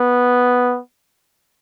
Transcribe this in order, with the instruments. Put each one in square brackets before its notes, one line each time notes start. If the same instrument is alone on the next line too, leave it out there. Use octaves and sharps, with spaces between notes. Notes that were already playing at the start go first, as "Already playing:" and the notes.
Already playing: [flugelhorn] B3